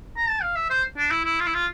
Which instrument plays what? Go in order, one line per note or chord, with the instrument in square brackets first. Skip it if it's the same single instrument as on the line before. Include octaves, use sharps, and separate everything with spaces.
[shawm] A#5
A5
F5
E5
C5
D4
E4
E4
F4
E4
F4